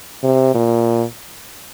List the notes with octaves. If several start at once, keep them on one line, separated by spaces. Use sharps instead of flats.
C3
A#2